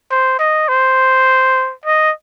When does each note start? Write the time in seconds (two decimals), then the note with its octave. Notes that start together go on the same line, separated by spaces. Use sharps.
0.11 C5
0.39 D#5
0.68 C5
1.85 D#5